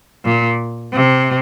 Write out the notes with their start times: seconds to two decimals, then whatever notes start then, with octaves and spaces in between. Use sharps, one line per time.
0.25 A#2
0.93 C3